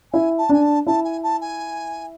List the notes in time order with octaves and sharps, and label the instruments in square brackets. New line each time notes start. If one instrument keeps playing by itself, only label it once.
[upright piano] E4 [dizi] G#5
[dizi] A5
[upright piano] D4 [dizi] G#5
[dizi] A5
[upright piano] E4 [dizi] A5
[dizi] G#5
A5
G#5